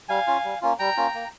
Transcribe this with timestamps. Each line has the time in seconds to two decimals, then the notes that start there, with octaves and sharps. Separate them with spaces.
0.09 G3 F5 G#5
0.27 C#4 F4
0.44 G3
0.62 A#3 C#4 F4
0.79 G3 G5 A#5
0.97 A#3 C#4 F4
1.15 A#3